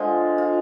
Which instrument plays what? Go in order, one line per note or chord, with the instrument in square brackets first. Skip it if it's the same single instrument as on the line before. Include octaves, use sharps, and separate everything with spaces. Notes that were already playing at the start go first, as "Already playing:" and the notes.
Already playing: [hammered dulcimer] D3 F3 G#3 F4
F4